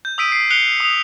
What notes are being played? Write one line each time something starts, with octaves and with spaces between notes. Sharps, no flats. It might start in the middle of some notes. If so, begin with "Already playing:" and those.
G6
D#6 E6 B6 D7 D#7
C7
F#6 C7 C#7 F7 G7
D#6 F7